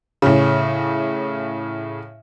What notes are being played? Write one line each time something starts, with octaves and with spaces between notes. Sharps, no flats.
A2 C#3